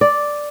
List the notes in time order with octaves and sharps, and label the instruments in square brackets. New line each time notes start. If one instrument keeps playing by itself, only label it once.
[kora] D5